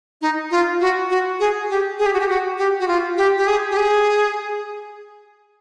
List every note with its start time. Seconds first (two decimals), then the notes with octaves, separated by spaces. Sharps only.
0.22 D#4
0.51 F4
0.81 F#4
1.10 F#4
1.40 G#4
1.69 G4
1.99 G#4
2.06 G4
2.14 F#4
2.20 G4
2.29 F#4
2.58 G4
2.80 F#4
2.88 F4
3.17 G4
3.38 G4
3.47 G#4
3.71 G4
3.77 G#4